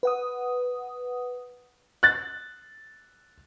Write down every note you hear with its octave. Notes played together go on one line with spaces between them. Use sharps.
B4 F#5 D#6
F#6 A6